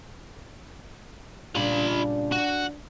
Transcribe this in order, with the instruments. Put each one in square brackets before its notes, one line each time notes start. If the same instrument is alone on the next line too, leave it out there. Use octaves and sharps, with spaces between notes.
[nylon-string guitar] A#2 C#3 G3 [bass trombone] D4 [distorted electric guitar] F4 B5
[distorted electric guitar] F#4